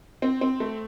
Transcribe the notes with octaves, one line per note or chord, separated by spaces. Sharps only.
C4
C4
A3